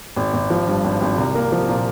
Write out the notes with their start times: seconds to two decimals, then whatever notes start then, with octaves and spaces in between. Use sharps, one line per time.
0.16 G#1
0.34 G#1
0.50 F3
0.67 G2
0.84 G#1
1.01 G#1
1.18 C2
1.35 A#3
1.52 F3
1.69 A#2